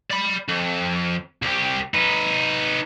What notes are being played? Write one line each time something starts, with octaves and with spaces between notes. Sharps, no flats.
D5 B5
F2
C2 G4
D#4 B4